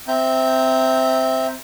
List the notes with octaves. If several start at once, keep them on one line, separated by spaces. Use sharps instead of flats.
C4 E5 A#5 G6